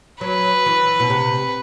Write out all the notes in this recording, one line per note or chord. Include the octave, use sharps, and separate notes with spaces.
F#3 B4
E3
B2
C3